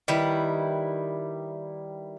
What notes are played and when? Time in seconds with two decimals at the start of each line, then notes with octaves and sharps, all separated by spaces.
0.08 D#3 G3 E4 B4